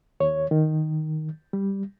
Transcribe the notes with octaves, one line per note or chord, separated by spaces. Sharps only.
D#2 C#5
D#3
G3